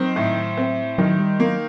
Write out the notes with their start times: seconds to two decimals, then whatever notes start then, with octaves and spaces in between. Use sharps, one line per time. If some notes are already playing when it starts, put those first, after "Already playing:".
Already playing: D#3 F#3 C4
0.16 A2
0.57 C4
0.98 D#3 F#3
1.19 G3
1.39 F#3 A#3